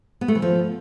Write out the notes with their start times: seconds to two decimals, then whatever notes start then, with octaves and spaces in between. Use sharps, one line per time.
0.21 B3
0.28 A3
0.35 E3
0.42 F3